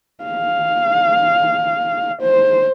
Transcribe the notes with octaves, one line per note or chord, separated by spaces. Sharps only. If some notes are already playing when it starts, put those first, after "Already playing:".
F5
C5